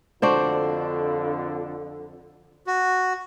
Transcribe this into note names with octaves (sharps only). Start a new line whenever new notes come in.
F2 D3 D4 F#4 C5
F#4